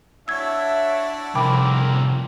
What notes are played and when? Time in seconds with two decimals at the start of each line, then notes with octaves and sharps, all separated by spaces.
0.28 D4 E4 F#4 C#5 E5 E6 G#6
1.35 C2 F3 C4 A#4 G5 B5 D6